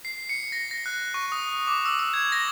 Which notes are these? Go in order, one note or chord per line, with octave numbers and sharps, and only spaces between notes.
C7
C#7
A#6
A#6
F#6
C#6
D#6
D6
E6
E6
G#6
A#6